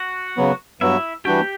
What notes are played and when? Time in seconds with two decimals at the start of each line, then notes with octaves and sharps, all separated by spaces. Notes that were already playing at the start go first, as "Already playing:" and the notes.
Already playing: F#4 F#5
0.37 C#3 F#3 B3
0.81 G2 F#3 B3 E4 F#4 E5
1.25 E3 G3 D4 F#4 G4 G5